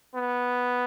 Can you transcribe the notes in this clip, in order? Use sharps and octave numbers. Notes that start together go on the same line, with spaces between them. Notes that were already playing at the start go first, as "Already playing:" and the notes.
B3